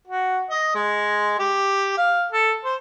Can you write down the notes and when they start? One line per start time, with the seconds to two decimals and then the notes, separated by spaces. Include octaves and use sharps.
0.07 F#4
0.50 D#5
0.74 G#3
1.39 G4
1.97 F5
2.32 A4
2.64 C5